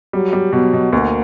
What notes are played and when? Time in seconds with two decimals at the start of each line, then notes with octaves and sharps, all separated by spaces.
0.13 F#3 G3
0.33 G3
0.53 B2 F#3
0.73 B2
0.93 D2 A#3